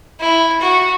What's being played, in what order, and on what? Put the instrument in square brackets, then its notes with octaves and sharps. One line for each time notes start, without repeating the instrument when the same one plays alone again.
[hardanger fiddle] E4
F#4